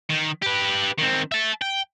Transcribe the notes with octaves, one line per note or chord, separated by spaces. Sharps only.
D#3
G4 B4
D#3 C4
E5 A5
G5